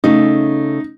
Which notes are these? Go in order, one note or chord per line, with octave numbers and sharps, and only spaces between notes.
C#3 A3 D#4